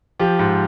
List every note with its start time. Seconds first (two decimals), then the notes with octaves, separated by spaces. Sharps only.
0.20 F3 G4
0.39 G#2